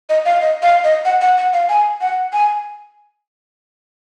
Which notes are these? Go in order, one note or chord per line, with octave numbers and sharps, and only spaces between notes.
D#5
F5
D#5
F5
D#5
F#5
F#5
F#5
F5
G#5
F#5
G#5